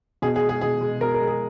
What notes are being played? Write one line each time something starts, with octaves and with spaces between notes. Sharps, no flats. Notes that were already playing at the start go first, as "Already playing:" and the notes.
B2 G#4
G#4
G#3
G#4
B2 G#4
G#3
B2 A#4
A#4
G#3
G#4